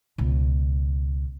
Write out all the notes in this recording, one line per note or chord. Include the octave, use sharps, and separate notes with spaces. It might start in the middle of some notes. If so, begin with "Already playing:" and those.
C#2 B2